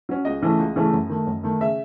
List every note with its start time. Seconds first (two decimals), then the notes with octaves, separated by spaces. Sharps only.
0.09 F#3 C#4
0.25 C#2 D#5
0.42 C#3 E3 A3 C#4
0.59 C#2
0.76 C#3 E3 A3 C#4
0.93 F#2
1.09 D#3 A3
1.27 F#2
1.43 D#3 A3
1.61 C#3 E5